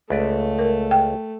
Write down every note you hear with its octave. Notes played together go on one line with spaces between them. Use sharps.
C#2 A3 B4 D5
A#4
G5